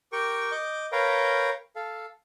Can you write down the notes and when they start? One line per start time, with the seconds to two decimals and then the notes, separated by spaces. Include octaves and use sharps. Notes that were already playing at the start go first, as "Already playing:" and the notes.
0.12 G4 A#4 G5 C#6
0.52 D#5 D6 G6
0.92 A#4 B4 C#5 F5 G5 A#5
1.76 A4 F5